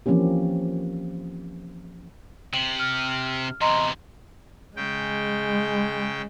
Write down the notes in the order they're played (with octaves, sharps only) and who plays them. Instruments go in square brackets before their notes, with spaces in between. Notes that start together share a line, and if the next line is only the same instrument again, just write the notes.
[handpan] E3 F3 A#3 C4 C#4 G4
[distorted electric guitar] C3 [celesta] F#7
[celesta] F6
[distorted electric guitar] E2 C3 [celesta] D#5 A#5 C6
[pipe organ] C#3 G5 [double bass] G#3